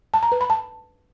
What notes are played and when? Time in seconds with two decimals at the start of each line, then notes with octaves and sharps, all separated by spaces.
0.14 A5
0.23 A#5
0.32 B4
0.41 B5
0.50 A5